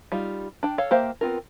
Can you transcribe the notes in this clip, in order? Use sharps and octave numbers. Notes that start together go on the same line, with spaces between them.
G3 D#4 F4
D4 G5
A4 C#5 F5
A#3 G4 C5 E5 F5
B3 C4 F4 A#4